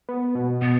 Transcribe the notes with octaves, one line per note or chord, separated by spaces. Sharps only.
B3
B2
B2 B3